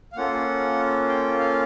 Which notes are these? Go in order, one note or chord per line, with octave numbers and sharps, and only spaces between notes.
F5
A#3 C#4 F4 A4 F#5
G5
F5